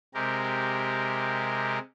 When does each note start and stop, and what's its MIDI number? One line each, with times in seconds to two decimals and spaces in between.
0.14 1.79 48
0.14 1.79 56
0.14 1.79 67
0.14 1.79 70